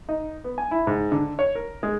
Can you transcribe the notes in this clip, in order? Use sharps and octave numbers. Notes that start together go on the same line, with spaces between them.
D#4
B3
G#5
E4
G#2
D3
C#5
A#4
G#3